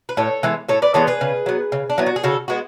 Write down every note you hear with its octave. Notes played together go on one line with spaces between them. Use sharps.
B4
A2 A4 C#5
E3 G#3 B3
A2 A4 C#5
B4 D5
E3 G#3 B3 A4 C#5
G#4 B4
C#3
F#3 B3
C#3
D4
F#3 B3 E4
F#4
G#4
C#3 F#4 A4
G#3 B3 F#4